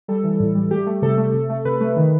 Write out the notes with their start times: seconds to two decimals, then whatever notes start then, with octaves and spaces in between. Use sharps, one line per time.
0.08 G3 A4
0.24 E3
0.40 A2
0.55 G3
0.71 A3 G4
0.87 A3
1.02 C3 A4
1.18 A3
1.33 C3
1.50 A3
1.65 C3 B4
1.81 A3
1.96 D#3